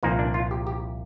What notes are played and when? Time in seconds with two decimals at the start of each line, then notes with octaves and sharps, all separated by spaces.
0.03 C2 A#2 F3 A#3 D#4
0.19 D4
0.34 F4
0.51 G4
0.67 G4